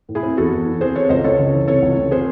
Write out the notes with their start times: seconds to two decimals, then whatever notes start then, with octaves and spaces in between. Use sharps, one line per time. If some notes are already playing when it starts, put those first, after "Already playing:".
0.09 A2
0.15 E4 G#4
0.23 C4
0.37 E2 F#4 A4
0.51 E2
0.66 E3
0.81 C4 G#4 C5
0.95 C4 A4 C#5
1.09 C#2 C5 D#5
1.24 C#2 A4 C#5
1.39 C#3
1.53 E3
1.68 C3 A4 C#5
1.82 C#2
1.97 C#2
2.11 C4 G#4 C5